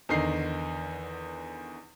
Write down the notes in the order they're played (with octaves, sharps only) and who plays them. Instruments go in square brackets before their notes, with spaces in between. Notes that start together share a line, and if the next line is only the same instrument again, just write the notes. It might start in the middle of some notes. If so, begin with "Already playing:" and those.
[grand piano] E2 D3 D#3 D#4 C7